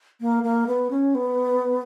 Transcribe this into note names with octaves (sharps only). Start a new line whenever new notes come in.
A#3
A#3
B3
C#4
B3